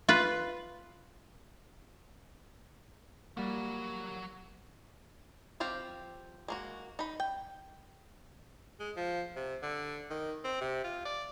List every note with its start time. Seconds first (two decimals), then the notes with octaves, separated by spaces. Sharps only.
0.09 F4 B4
3.37 F#3 G3 A#3 F#5
5.60 F3 C4 G4 F5
6.48 G#3 A#3 F#4
6.99 D#4 B5
7.20 G5
8.80 G#3
8.97 F3
9.36 C3
9.63 D3
10.10 D#3
10.45 C4
10.61 C3
10.84 F4
11.06 D5